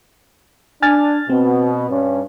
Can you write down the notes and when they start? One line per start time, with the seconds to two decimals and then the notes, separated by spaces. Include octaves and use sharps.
0.82 D4 G#5 F6 A6
1.30 B2 C4
1.90 G2 C#4